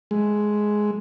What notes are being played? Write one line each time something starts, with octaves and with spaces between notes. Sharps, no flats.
G#3